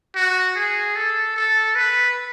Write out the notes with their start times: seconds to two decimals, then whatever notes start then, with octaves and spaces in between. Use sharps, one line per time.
0.15 F#4
0.55 G#4
0.96 A4
1.36 A4
1.75 B4